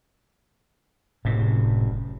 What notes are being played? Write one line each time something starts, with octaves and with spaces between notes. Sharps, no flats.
F#1 A2 C3